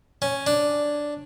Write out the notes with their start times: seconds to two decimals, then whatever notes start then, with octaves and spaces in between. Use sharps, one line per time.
0.22 C#4
0.47 D4